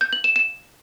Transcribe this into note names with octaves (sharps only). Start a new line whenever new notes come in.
G6
F#7
E7
E7